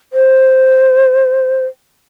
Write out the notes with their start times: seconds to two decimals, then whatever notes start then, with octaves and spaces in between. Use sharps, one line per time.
0.13 C5